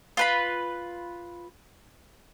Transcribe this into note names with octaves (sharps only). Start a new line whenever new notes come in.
F4 B4 B5